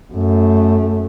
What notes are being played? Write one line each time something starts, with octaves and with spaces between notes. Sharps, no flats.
F#2 A3